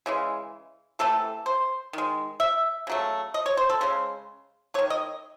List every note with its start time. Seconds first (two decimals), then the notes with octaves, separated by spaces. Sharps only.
0.06 C#3 E3 G#3
0.99 C3 E3 A3 A4
1.46 C5
1.93 D#3 G#3
2.40 E5
2.87 C#3 F#3 A3
3.34 D#5
3.46 C#5
3.57 C5
3.70 A4
3.81 C#3 G#3 C5
4.74 A3 C#5
4.79 D#3
4.90 D#5